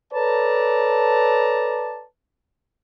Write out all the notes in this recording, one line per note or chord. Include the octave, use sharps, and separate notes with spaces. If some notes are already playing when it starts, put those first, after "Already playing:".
A4 B4 C#5 D5 A5 A#5